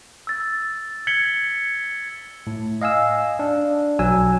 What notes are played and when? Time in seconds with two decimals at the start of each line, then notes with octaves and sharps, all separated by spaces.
0.27 E6 A6
1.07 G#6 B6 C#7 F#7 G7
2.47 A2
2.81 D#5 F5 G#5 E6
3.39 D4
3.99 B1 F#3 G#5 E6